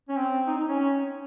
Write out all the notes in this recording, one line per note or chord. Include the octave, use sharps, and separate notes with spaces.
C#4
C4
D#4
D#4
C#4
C#4